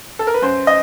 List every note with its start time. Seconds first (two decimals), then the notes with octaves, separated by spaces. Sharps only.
0.19 A4
0.27 A#4
0.34 B4
0.42 F#2 C5
0.67 D#5